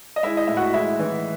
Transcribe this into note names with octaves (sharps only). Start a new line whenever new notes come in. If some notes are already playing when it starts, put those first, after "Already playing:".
D#5
G#3 E4 E5
D#5
A2 E5
F#4 F#5
G#3 E4 E5
E3